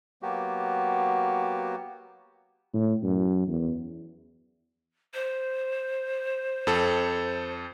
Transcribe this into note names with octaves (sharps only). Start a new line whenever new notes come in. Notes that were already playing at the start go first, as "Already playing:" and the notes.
F#3 A#3 B3 F#4 G4
A2
F#2
E2
C5
F2 A4